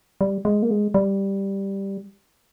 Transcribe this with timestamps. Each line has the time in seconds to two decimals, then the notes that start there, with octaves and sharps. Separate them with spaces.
0.21 G3
0.45 G#3
0.62 A#3
0.71 G#3
0.94 G3